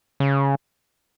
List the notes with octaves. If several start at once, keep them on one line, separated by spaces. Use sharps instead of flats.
C#3